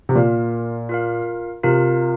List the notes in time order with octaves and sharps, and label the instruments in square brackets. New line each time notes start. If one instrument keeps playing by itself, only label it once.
[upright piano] C3
[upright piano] A#2 [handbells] F4 A#4 F5
[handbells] F4 A#4 F5
[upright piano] C3 [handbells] F4 A#4 F5